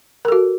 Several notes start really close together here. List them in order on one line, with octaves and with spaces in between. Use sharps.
A#4 A4 F#4